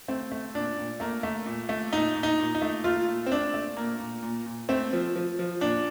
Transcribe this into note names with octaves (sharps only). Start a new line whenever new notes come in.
A3 C4
A3
A#2 D4
A#2
A3 A#3
A3
A#2
A3
A#2 D#4
A#2
D#4
A#2
D#4
A3
A3 F4
A#2
C4
A3 D4
A3
A#2 A#3
A#2
A#2
A#2
A3 C4
F3
F3
F3
A#2 D4